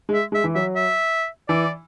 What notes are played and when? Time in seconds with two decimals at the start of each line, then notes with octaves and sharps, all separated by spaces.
0.09 G#3
0.14 E5
0.32 G#3
0.35 E5
0.44 E3
0.55 F#3 E5
0.76 E5
1.48 E3 D5